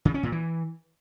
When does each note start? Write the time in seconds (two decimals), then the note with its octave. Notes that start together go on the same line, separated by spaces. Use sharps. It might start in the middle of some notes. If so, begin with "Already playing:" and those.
0.05 C#3
0.14 C#4
0.23 A#2
0.32 E3